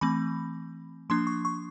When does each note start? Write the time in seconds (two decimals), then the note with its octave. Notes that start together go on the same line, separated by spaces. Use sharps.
0.01 E3 A3 C4 B5
1.10 F3 A#3 D4 C6
1.27 C#6
1.45 C#6